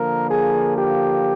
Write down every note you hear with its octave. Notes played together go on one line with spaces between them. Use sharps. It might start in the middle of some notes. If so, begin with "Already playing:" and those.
Already playing: D3 F3 A#3 A#4
G#4
G4